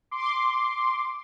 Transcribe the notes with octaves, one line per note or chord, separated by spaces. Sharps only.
C6 D6